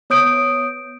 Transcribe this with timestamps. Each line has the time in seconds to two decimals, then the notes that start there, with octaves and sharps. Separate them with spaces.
0.10 B3 C#5 D#6 G6 D7